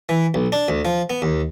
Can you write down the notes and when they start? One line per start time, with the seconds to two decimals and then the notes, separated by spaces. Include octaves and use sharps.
0.09 E3
0.34 B1
0.52 D4
0.68 D2
0.85 F3
1.10 B3
1.22 D#2